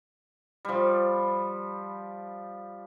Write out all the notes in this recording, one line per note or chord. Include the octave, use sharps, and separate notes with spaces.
F3 G3